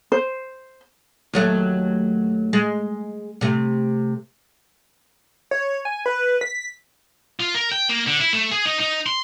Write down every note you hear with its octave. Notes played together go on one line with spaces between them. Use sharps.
C5
D#2 F#3 A3
G#3
C3 A3
C#5
G#5
B4
B6
F4
A#4
G5
A#3
D3
E4
A3
G#4
D#4
D#4
C6